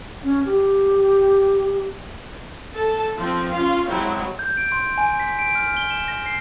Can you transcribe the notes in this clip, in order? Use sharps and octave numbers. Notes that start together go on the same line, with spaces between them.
C#4
G4
A4 A5
F3 C4
C#4 F4 F5
F#3 G#3 C4 E4
G6
D7
C6
G#5
B6
D7
F6
G7
E7
A#6
C7